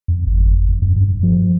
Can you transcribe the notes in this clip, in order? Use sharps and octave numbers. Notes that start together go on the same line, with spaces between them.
F2
G1
F#1
F2
F#2
G2
F3